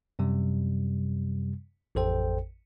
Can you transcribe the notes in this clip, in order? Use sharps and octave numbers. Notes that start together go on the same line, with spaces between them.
F#2 C3 G3
A1 F2 A4 C5 G5